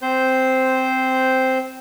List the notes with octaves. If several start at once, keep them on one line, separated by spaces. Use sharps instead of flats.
C4 C5 G6